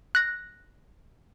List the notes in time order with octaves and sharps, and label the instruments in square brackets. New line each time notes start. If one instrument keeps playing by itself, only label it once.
[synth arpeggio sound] F#6 A#6